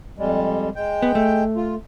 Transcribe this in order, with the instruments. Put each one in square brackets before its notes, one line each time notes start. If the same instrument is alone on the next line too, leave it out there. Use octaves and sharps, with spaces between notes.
[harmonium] F2 G3 G#3
G#3 G5
[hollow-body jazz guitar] B3
A3
[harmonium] F4